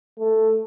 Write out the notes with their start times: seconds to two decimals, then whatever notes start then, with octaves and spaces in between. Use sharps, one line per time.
0.19 A3